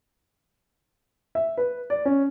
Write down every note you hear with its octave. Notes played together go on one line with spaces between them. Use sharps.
E5
B4
D5
C#4